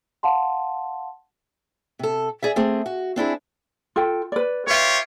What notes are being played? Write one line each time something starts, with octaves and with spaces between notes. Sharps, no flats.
F5 F#5 A5 C6
C3 A4
G#4 D5 E5
A3 C4 G#4
F#4
C4 D4 E4 G#4
F4 A4 G5
B4 D5
F4 G4 B4 C#5 E5